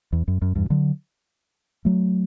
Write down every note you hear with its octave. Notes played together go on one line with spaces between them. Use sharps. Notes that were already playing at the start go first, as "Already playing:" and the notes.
E2
F#2
F#2
E2 G2
D3 F#3
F#3 A3